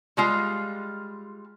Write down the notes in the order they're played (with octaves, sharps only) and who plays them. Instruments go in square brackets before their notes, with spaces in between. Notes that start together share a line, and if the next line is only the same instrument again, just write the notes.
[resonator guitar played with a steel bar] G3 G#3 F4 F5